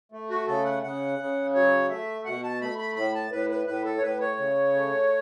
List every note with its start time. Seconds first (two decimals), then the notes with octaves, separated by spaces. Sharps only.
0.12 A3
0.30 F#4
0.47 C#3 A4
0.65 F#5
0.83 C#3 F#5
1.19 C#3
1.53 F#3 C#5
1.89 A3 E5
2.25 B2 F#5
2.43 A5
2.61 A3 B5
2.78 B5
2.96 A2 B5
3.14 A5
3.31 A2 B4
3.50 B4
3.67 A2 B4
3.85 A4
3.98 C#5
4.02 A2 B4
4.20 C#5
4.38 C#3
4.74 A3